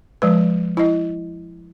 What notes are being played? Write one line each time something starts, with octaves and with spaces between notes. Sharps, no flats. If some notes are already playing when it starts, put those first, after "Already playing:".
F3 G#3 B4
E4 D#5